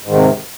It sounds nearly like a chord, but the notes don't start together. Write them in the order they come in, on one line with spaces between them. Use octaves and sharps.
G#2 D#3 C3